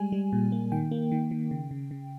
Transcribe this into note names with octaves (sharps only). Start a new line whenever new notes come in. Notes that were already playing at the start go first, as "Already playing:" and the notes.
Already playing: G3 G#3 G#5
G3
A#2
A#3
D#3 G5
A#3
D#3
D#3
C#3
C#3
C#3